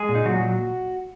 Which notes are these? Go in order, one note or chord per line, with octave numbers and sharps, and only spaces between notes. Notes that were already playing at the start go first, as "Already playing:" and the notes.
Already playing: G#3 G#4
A#2
D#4
A#2 F#3 F#4
F#3